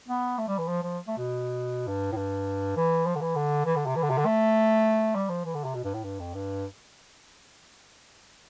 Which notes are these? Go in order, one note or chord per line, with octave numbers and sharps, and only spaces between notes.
B3
A3
G3
E3
F3
F3
A3
B2
G2
A2
G2
E3
F3
D3
E3
D3
E3
D3
C3
E3
D3
C3
D3
A3
G3
F3
E3
D3
C3
B2
G2
A2
G2
F2
G2